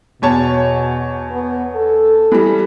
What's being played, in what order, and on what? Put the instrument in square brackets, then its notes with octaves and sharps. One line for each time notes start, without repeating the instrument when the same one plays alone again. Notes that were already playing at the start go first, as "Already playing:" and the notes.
[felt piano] E2 C#5 A5 [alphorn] B2
[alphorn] B3
A4
[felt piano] E3 G3